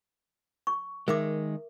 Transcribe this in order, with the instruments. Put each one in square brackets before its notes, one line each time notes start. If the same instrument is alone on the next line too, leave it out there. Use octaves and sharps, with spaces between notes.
[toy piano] C#6
[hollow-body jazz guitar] D#3 G#3 [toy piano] A#4 E5 D6